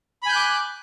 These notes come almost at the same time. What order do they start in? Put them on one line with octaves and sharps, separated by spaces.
B5 G#5 G6 F#6 D6